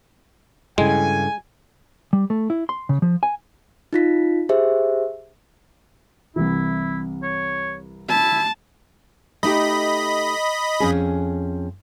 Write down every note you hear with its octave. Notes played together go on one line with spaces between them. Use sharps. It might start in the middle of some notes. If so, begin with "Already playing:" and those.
G2 C#3 G#3 E4 A4 G5 G#5
G3
A3
E4
C6
C#3
F3
G#5
D#4 F4 B6
G4 G#4 C5 E5
C2 E3 E4
C#5
E4 A5
A3 D#4 G4 D#5 B5
F2 C#4 G#4